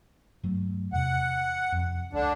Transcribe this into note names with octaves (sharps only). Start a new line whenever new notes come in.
G2 F#3 A3
E2 C3 F#5
F2
C#2 D3 D4